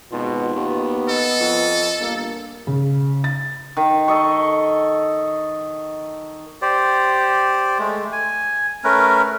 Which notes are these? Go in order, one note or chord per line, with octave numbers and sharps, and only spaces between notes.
G#1 B2 F4
D#2 B3
A4 D#5
F2
G1 A#3
C#3
A6
D#3
A4 D#5 C#6
G4 C5 D5
G#3 A3
G#5
A3 C#4 A#4 B4